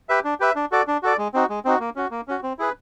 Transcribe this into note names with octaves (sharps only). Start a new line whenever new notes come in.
G4 B4 E5
D4
G4 B4 E5
D4
F#4 A4 D5
D4
F#4 A4 D5
G#3
C4 D#4 F#4
G#3
C4 D#4 F#4
A#3
C#4 F#4
A#3
C#4 F#4
C4
E4 G#4 B4